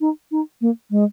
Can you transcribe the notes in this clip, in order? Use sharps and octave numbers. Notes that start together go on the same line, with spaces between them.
D#4
D#4
A#3
G#3